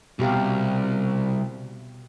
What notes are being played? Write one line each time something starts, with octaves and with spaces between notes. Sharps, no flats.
C2 B2 G4 F5